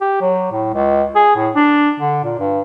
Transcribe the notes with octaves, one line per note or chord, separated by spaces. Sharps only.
G4
F#3
A2
C#2
G#4
A2
D4
D3
A#2
G2